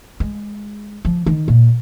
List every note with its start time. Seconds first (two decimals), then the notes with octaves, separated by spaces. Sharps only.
0.20 G#3
1.05 F3
1.26 D#3
1.48 A#2